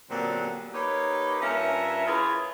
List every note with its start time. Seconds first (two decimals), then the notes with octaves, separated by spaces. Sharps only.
0.11 A#2 D3 F#3 G3 B3 C4
0.74 A#3 D#4 G4 B4 C#5
1.41 G2 C#4 F4 A#4 E5
2.06 E4 F4 G#4 A#4 B4 C#5